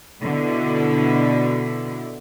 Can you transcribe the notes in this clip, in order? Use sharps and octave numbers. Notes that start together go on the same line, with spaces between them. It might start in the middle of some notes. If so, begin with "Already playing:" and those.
B2 D3 E4